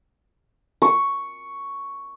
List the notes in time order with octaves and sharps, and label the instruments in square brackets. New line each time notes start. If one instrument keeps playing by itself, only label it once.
[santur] C#6